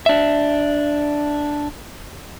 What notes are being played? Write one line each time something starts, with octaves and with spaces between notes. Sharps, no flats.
D4 E5